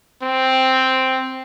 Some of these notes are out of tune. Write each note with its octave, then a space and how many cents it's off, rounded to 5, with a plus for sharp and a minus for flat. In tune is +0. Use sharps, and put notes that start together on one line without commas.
C4 +0